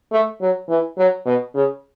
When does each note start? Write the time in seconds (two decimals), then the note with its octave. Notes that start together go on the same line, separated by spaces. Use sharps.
0.12 A3
0.41 F#3
0.69 E3
0.98 F#3
1.26 B2
1.55 C#3